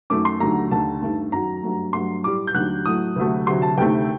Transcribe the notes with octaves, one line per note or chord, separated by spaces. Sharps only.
F#2 D#3 A3 D6
C6
D#2 D3 F#3 A3 A#5
D#2 D3 A3 A5
G2 D#3 A3
F#2 D#3 F#3 A#5
G2 F#3 A3
G2 F#3 A3 C6
A2 G3 D6
G6
D#2 D3 F#3 A3 F#6
A2 F#3 A3 D#6
D2 C3 F#3 A3
D2 C3 F#3 C6
A5
D2 C3 D#3 A3 G5